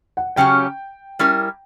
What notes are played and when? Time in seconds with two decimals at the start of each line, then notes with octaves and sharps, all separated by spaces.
0.17 F#5
0.36 C#3 F#3 C#4 G4 G5
1.19 G3 C#4 E4 A#4